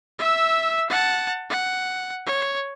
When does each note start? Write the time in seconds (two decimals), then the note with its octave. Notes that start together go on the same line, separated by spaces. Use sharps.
0.19 E5 E6
0.90 F#5 A5
1.50 F#5
2.26 C#5